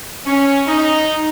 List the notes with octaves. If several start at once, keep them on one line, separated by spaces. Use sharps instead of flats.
C#4
D#4